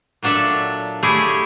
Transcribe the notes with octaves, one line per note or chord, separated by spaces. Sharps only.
A#2 F#3 D4 A4 E5
A3 E4 G4 G#4